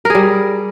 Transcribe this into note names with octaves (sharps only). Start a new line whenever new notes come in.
G3 G#4 A#4